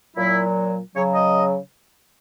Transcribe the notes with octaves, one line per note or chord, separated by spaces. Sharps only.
A#2 F#3 E4
C#3 F#3 C#5
D#5